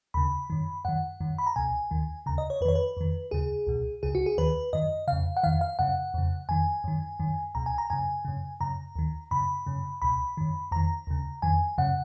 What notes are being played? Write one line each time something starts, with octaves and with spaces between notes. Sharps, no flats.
D#2 C#3 B5
F#2 D#3
F#2 D#3 F#5
F#2 D#3
B5
A#5
C#2 B2 G#5
D#2 D#3
D#2 C#3 A#5
D#5
C#5
F2 D#3 B4 C#5
B4
F2 D#3
D#2 C#3 G#4
C#2 B2
C#2 C#3 G#4
F#4
G#4
D#2 D#3 B4
F#2 D#3 D#5
F2 C#3 F5
F#5
F2 D#3 F5
F5
F#2 C#3 F#5
F2 C#3
F2 D#3 G#5
F#2 D#3
F#2 D#3
C#2 B2 A#5
G#5
A#5
F#2 C#3 G#5
F#2 C#3
F#2 C#3 A#5
D#2 D#3
F#2 C#3 B5
F#2 C#3
C#2 B2 B5
F#2 D#3
F2 D#3 A#5
D#2 C#3
F2 D#3 G#5
F#2 C#3 F#5